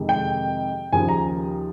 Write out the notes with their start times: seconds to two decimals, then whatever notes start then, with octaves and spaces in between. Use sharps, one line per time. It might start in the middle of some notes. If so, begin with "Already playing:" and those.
Already playing: F2 C3 D#3 G#3
0.09 G5
0.92 D#2 C#3 F3 G#5
1.09 A#5